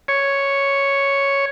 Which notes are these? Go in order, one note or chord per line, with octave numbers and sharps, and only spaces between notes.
C#5